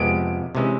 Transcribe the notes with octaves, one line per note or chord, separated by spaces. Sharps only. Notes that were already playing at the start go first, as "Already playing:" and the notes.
Already playing: F2 C3 F3 G#3 B3 D7
C3 E3 G#3 C#4